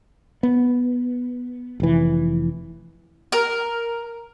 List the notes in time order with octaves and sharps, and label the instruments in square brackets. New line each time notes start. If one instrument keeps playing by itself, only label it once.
[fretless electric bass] B3
F1 E3
[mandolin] A#4